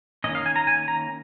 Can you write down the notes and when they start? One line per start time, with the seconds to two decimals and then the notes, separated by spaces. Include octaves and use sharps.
0.24 D#3 A#3 C#4 D#5
0.35 F5
0.46 G#5
0.56 A#5
0.67 G#5
0.88 A#5